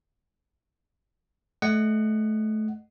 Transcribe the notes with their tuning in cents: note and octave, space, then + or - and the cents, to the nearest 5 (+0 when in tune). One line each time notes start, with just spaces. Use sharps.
A3 -25 D#5 -25 F#5 +10